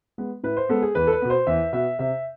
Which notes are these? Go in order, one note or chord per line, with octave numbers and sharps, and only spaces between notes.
G#3 B3
A2 B4
C5
G#3 B3 A4
G#4
E2 B4
A4
B4
B2 B3
C5
E2 E5
B2 B3 E5
C3 E5